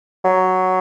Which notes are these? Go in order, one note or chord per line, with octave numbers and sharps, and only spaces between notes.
F#3